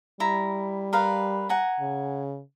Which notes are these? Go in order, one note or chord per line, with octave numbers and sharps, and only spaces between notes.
G3 E4 A#5
A#4 B4 F5
F#5 G#5 A#5
C#3